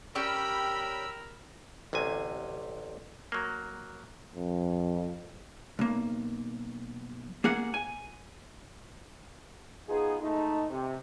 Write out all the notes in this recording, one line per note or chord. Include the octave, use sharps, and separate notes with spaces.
C#4 G4 A#4 D5 G5 B5 E6
A1 D2 C3 G#5
F#3 A#3
F2
B1 A#3
A#3 G#4 F#5
G#5
B3 D#4 F4 G#4
G#3 A3 D#4
C3